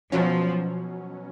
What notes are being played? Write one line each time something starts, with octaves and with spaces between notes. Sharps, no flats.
B2 F3 F#3 C#4